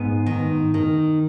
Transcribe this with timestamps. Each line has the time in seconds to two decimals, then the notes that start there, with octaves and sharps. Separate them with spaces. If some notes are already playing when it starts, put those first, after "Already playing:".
Already playing: G#2 B3
0.26 D#3
0.74 D#3